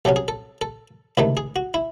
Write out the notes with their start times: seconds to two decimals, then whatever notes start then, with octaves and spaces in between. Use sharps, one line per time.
0.05 C2 C3 F#3 C#4 A4
0.16 G#4
0.28 A4
0.61 A4
1.17 C#2 C3 D#3 A3 E4
1.37 G#4
1.56 F#4
1.74 E4